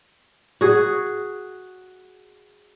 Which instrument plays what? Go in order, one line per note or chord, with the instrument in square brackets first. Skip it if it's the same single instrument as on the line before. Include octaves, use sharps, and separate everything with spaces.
[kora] F#4 G#4